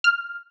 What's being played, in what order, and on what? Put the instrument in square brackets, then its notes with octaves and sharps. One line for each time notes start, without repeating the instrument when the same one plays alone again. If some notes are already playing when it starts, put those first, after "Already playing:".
[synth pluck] F6